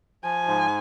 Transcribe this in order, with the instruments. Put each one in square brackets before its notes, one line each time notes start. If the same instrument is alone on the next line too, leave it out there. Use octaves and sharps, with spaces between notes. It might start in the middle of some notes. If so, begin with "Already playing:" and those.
[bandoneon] F3 [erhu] G#5
[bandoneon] G#2